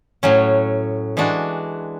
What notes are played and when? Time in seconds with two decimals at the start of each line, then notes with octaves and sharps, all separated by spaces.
0.23 A2 F#3 C#4
1.17 E3 G#3 D4 F#4